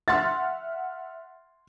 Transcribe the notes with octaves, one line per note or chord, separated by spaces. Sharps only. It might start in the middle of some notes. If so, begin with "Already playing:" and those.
E5 F#5 C6 F6 A6